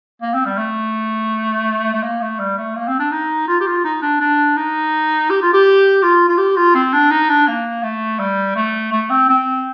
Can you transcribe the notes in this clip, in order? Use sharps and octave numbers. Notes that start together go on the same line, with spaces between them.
A#3
C4
G3
A3
A3
A#3
A3
G3
A3
A#3
C4
D4
D#4
F4
G4
F4
D#4
D4
D4
D#4
G4
F4
G4
F4
F4
G4
F4
C4
D4
D#4
D4
A#3
A3
G3
A3
A3
C4
C4